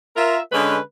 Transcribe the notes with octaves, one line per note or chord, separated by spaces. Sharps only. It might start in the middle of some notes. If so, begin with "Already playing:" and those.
F4 A#4 E5
D3 G#3 C#4 B4